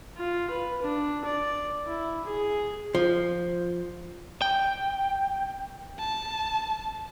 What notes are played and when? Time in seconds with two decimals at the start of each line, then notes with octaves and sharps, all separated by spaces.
0.17 F4
0.50 B4
0.82 D4
1.25 D5
1.87 E4
2.25 G#4
2.95 F3
4.42 G5
5.99 A5